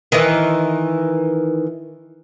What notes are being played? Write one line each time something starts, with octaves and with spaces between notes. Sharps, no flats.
D#3 E3